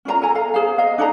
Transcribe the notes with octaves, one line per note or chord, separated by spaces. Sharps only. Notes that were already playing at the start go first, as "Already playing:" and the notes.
C#4 F4 C5 A#5
A4 G#5 A#5
A4 F5
G#4 C5 F5
D#5 F5
D4 D#4 A4 A#5